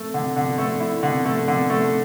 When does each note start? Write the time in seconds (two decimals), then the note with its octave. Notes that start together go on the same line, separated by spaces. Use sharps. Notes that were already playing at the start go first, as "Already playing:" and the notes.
Already playing: A3
0.14 D3
0.36 D3
0.58 A3
0.80 E4
1.03 D3
1.25 A3
1.48 D3
1.70 A3